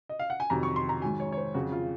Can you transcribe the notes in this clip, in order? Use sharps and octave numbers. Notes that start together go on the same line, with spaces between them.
D#5
F5
F#5
G#5
F2 C3 D#3 F#3 A#5
C#6
C6
A#5
G#2 D#3 F#3 G#5
C#5
C#5
C5
F2 C#3 F#3 F#4
F4